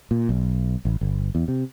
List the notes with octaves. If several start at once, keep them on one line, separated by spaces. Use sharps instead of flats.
A#2
B1
A1
G1
E2
C3